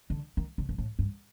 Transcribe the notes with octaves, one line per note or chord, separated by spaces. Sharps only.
D3
D#3
D3
G2
A2
G2